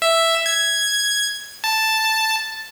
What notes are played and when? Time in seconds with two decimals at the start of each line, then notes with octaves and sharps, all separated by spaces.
0.02 E5
0.46 G#6
1.64 A5